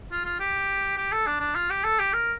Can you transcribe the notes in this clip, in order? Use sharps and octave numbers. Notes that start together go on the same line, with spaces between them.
F4
F4
G4
G4
A4
D4
D4
F4
G4
A4
G4
A#4